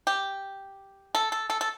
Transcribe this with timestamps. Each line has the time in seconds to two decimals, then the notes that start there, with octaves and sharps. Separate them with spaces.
0.07 G4
1.15 A4
1.32 A4
1.50 A4
1.61 A4